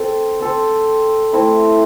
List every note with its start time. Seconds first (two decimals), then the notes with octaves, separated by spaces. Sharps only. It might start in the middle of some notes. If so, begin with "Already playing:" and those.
Already playing: C4 A4 C5
0.40 C4 A4 C5
1.33 A3 C4 E4